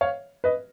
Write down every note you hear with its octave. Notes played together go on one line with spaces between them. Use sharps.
C#5 F5
B4 D#5